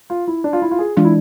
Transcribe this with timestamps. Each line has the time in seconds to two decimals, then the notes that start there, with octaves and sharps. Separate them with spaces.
0.10 F4
0.27 E4
0.44 D4
0.53 F4
0.62 E4
0.71 F4
0.79 G#4
0.96 E3 G#3 D4 F4
1.05 E4